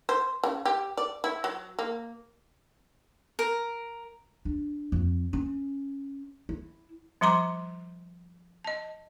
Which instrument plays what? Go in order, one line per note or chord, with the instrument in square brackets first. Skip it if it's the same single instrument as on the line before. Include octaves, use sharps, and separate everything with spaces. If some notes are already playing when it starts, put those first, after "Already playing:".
[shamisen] C5
C#3
G4
D5
E4
F#3
A#3
[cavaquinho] A#4
[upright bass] D4
F2
C#4
E4
[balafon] F3 G3 A#5 C6 D6
D#5 A5